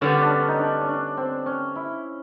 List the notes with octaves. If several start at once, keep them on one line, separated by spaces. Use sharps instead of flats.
D3 G3 B3 C#4
D4
C#4
D#4
D4
C#4
D4
C4
C#4
E4